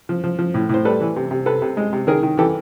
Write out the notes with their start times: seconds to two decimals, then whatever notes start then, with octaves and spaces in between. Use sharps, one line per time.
0.09 F3
0.24 F3
0.39 F3
0.54 A2
0.69 A2 C5
0.85 G3 A4 B4
1.01 E3
1.16 C3
1.31 C3
1.46 C3 A4 B4
1.62 C3
1.77 G#3
1.93 C3
2.07 D#3 G#4 A#4
2.23 D#3
2.38 E3 G4 A4